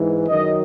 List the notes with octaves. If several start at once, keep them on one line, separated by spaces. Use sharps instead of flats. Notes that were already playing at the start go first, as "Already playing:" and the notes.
Already playing: G#2 E3
F#2 D#3 F#3 D#5